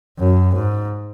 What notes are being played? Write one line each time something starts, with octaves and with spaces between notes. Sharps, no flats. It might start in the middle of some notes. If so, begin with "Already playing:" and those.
F#2
G#2